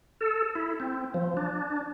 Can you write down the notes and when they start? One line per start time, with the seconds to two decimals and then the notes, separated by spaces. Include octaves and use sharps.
0.21 A4
0.55 E4
0.80 C4
1.14 F3
1.37 D4